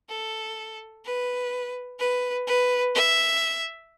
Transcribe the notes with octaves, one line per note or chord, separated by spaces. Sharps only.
A4
B4
B4
B4
E5